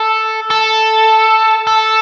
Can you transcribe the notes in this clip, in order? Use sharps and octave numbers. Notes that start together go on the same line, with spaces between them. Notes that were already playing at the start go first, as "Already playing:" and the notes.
Already playing: A4
A4
A4